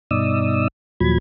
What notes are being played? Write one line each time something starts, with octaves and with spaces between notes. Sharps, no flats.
G2 B2 D#4 D5 D#6 E6
D#2 A#2 F3 F#3 B5 G#6